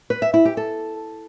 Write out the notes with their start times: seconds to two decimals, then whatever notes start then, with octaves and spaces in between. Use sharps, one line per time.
0.10 B4
0.22 E5
0.34 E4
0.45 G4
0.57 A4